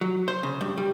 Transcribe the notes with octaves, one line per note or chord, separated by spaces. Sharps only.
F#3
C5
C#3
G2
G3